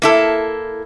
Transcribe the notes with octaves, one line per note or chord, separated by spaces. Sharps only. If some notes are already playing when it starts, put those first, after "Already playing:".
A#3 E4 A4